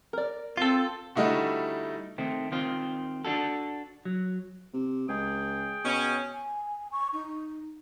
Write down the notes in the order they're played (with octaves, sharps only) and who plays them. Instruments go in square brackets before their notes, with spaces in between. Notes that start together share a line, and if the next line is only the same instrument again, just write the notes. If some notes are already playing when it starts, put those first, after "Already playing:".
[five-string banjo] A#4 D5
[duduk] C4 [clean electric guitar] F4 A4
[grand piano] D3 G3 A3 D#4 E4 F#4
[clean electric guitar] D#3 A3 C4
D#3 C4 F4
D4 F#4 A4
F#3
[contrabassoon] C3
[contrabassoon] C#2 [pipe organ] G#4 G5
[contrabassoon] B2 [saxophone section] C#4
[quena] G#5
C#6
D#4